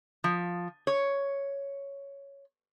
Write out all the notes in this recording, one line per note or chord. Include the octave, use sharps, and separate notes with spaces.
F3
C#5